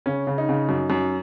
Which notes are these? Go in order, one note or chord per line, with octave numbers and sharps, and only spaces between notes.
C#3 C#4
C#3
D#4
C#3
F#2
F#2